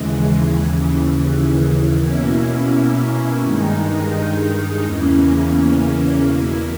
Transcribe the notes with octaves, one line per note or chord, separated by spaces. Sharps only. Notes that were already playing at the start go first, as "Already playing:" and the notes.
Already playing: D#2 C#3 E3 G#3
D#2 C#3 E3
B2 A#3 C#4 E4
G2 D#3 G#3 D#4
E2 C#3 E3 A#3 C#4
E2 B2 A#3 E4